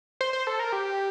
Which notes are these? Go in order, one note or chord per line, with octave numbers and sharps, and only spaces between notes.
C5
C5
A4
A#4
G4